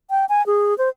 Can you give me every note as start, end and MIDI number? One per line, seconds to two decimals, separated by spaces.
0.10 0.25 79
0.29 0.45 80
0.46 0.76 68
0.78 0.89 72